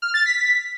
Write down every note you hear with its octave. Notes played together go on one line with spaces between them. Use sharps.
F6
A6
B6